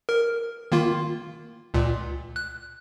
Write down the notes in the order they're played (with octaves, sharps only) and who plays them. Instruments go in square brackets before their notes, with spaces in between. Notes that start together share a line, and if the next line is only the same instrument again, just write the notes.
[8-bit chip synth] A#4
D#3 A#3 F4
C#2 A#2
F#6